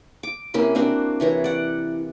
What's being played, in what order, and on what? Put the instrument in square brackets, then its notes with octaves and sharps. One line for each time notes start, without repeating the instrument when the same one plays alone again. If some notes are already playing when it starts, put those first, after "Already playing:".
[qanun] D6
C3 A#3 C#4 E4
A#3 C4 D4 F#4
C3 E3 C#5 A#5
D5 F#5